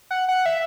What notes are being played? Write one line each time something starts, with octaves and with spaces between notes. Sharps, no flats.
F#5
F#5
E5